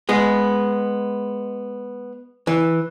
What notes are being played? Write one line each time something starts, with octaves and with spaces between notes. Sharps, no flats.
G#3 B3
E3